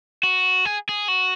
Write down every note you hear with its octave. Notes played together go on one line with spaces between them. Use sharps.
F#4
G#4
G#4
F#4